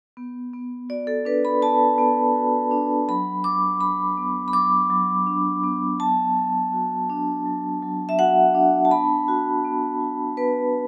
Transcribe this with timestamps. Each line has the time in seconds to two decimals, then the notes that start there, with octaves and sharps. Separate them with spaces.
0.17 B3
0.53 B3
0.89 F#4 D5
1.07 A4
1.25 D4 B4
1.45 B5
1.62 B3 A5
1.98 B3
2.35 F#4
2.71 D4
3.08 F#3 B5
3.44 F#3 D6
3.81 D4 B5
4.17 B3
4.48 B5
4.53 F#3 D6
4.90 F#3
5.27 D4
5.64 B3
6.00 F#3 A5
6.37 F#3
6.73 F#4
7.10 D4
7.46 F#3
7.83 F#3
8.09 E5
8.19 F#4 F#5
8.54 D4
8.85 A5
8.91 B3 B5
9.28 F#4
9.65 B3
10.01 F#4
10.37 B3 B4